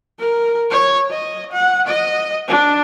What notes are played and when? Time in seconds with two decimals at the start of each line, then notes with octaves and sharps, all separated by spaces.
0.19 A#4
0.71 C#5
1.10 D#5
1.52 F#5
1.87 D#5
2.48 D4